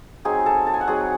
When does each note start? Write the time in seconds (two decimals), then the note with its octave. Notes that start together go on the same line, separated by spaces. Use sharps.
0.25 F#3 C4 D#4 G#4 G#5
0.46 A4 A5
0.67 A5
0.74 G#5
0.81 F#5
0.87 F#3 C4 D#4 G#4 G#5